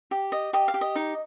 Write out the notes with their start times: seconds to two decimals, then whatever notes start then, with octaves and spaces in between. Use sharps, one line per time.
0.11 G4
0.32 D#5
0.53 G4 D#5
0.68 F5
0.74 G4
0.81 D#5
0.96 D#4